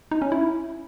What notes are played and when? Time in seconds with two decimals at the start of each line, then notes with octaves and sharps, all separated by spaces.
0.11 D#4
0.22 C#4
0.32 E4